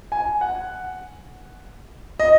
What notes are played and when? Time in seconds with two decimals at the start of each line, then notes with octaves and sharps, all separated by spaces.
0.12 G#5
0.41 F#5
2.20 D#5